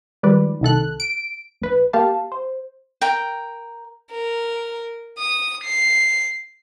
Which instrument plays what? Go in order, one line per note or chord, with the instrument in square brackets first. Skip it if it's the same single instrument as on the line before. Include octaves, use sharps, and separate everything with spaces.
[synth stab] D#3 F3 G3 G#3 B4 D5
C2 D#3 A4 F#6
D7
A#1 B4
A#3 G4 F5 A5
C5
[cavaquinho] A#4 G5
[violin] A#4
D#6
C7